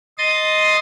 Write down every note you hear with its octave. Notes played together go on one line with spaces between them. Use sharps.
D#5 C6 D#6 A6